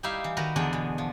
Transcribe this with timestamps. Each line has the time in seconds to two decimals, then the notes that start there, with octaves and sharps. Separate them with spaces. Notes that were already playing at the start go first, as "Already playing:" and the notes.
0.03 G3 D#4 E4 G4 E5 F5
0.24 E3
0.37 D#3 F#4 A#4 B4
0.56 E2 D3 E3 D4 G#4
0.73 B2
0.98 F3